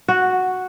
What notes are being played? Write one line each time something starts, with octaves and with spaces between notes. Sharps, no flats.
F#4